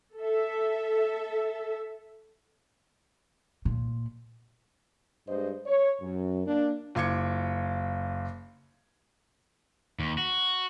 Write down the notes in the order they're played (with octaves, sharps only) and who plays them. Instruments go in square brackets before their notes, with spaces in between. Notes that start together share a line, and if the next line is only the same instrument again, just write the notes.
[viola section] A4 E5
[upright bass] A#2
[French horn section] G2 G#3 C5 D#5
C#5
F#2
A#3 D4
[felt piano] F#1 F4 D6 G#6 C#7
[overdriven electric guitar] D#2
F#4